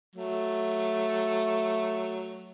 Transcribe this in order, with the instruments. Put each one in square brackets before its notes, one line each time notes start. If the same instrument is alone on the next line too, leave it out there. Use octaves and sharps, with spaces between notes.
[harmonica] F#3 A3